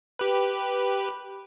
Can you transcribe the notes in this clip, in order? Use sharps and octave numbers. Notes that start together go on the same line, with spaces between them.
G4 B4